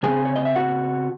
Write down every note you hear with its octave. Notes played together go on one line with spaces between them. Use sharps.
C#3 G#3 G#4 G#5
C4
C#5
D#5
E5
F#4 F#5